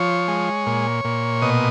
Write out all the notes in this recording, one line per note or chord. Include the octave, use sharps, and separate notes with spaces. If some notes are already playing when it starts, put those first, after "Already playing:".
Already playing: F3 C#5
G#3
A#2
A#2
B2 D#5